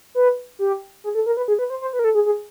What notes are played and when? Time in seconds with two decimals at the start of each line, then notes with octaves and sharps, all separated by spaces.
0.15 B4
0.59 G4
1.04 G#4
1.15 A4
1.26 A#4
1.37 B4
1.48 G#4
1.59 B4
1.70 C5
1.81 C5
1.93 B4
1.99 A#4
2.04 A4
2.15 G#4
2.26 G#4